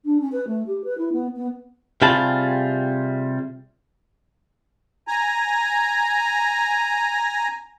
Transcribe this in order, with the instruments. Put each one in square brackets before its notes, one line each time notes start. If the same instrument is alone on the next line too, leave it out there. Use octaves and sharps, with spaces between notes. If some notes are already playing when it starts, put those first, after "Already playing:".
[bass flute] D4
C#4
B4
A3
G4
B4
E4
B3
B3
[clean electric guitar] C3 G3 F4 G#4 A5 B5
[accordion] G#5 A#5